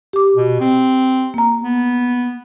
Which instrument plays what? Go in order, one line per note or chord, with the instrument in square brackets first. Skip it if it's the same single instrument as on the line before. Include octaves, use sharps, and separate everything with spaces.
[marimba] G4 D6
[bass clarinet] B2
C4
[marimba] A#3 A#5
[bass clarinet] B3